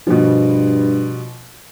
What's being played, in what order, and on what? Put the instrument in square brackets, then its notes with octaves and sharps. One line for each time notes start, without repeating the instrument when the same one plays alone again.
[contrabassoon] G2 [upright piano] B2 F3